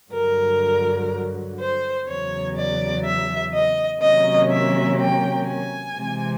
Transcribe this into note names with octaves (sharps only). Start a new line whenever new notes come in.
G2 D3 F#3 A#4
C5
E2 C#3 F#3 B3 C#5
D5
E5
D#5
C3 D#3 F#3 A#3 C#4 D#5
E5
G5
G#5
C3 E3 G#3 C4